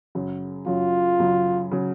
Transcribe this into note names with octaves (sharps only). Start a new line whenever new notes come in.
F#2 C#3 F#3
F#2 C#3 F#3 F4
F#2 C#3 F#3
C#3 F#3